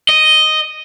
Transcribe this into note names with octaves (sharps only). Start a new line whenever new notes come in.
D#5